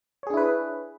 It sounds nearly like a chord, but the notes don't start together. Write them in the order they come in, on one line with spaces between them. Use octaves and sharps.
C#5 G#4 D4 E4 B4